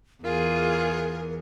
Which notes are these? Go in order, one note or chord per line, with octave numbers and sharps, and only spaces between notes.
E2 F4 G#4 A#4